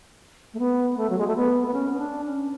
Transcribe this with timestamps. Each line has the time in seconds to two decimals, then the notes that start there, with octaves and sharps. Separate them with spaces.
0.53 A3
0.59 B3
0.97 A3
1.10 F#3
1.18 G#3
1.27 A3
1.36 B3
1.67 B3
1.73 C#4
1.94 C#4
1.98 D4
2.24 C#4